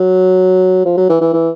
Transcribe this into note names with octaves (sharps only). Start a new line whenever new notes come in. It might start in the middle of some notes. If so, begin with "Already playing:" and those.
Already playing: F#3
F3
F#3
E3
E3
E3